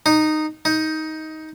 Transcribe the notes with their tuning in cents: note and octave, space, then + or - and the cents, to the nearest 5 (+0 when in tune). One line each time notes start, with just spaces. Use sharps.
D#4 -10
D#4 +15